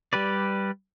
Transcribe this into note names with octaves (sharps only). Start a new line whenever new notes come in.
G3 G4 B4 D5